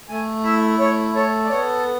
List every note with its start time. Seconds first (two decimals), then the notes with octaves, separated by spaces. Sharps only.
0.09 A3 G#5
0.44 E4 E5
0.79 A3 C#5
1.15 A4 C#5
1.45 D5
1.49 B3 C#5